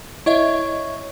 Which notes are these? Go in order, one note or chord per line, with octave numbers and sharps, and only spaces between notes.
E4 C#5 D#5 E5